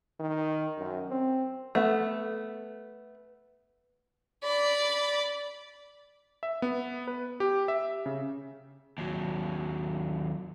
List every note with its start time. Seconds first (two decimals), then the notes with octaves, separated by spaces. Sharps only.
0.19 D#3
0.78 F#2
1.10 C4
1.75 A3 B3
4.43 D5 B5
6.43 E5
6.62 B3
7.08 B4
7.40 G4
7.68 E5
8.06 C#3
8.98 D#2 F#3